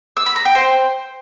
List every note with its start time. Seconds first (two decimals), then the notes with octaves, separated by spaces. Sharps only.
0.17 E6
0.26 B5
0.36 A#5
0.45 G5
0.55 C5